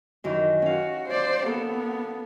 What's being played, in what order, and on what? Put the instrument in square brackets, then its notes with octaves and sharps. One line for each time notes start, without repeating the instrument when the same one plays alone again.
[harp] F#2 D#3 E3
[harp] C#4 F5 [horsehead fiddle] F#4
[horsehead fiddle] C5 D5
[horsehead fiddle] A#3 B3 [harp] A4